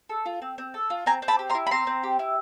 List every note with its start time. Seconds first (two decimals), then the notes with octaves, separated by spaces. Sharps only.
0.10 A4
0.26 F4
0.42 C4
0.58 C4
0.74 A4
0.90 F4
1.06 C4 G#5 A#5
1.22 C4
1.28 A5 B5
1.39 G4
1.49 A#5 C6
1.55 E4
1.67 B5
1.71 C4 A#5 C6
1.87 C4
2.03 G4
2.19 E4